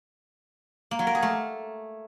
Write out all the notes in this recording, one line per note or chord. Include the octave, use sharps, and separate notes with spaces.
A#3
F#3
A#4
G#4
A3